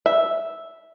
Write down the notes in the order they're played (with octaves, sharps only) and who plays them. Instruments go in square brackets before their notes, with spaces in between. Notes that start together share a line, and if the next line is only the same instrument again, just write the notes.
[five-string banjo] E5